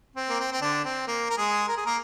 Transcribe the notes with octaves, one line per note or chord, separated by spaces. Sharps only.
C4
A#3
C4
C4
D3 D4
C4
A#3
A#4
G#3 G#4
A#4
G#4
A#3 A#4